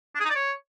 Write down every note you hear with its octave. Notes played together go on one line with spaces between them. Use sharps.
D4
G#4
D#4
D5
C#5